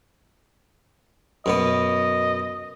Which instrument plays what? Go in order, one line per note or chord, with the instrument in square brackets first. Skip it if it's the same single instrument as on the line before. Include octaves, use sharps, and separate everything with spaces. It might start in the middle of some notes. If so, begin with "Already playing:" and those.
[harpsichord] F#2 B2 B3 [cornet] D#5